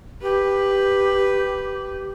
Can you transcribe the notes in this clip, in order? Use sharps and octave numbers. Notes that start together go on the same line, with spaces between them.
G4 B4